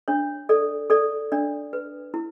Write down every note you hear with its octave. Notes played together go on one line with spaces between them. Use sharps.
D4 C#5
A4 D5
A4 D5
D4 D5
B4
E4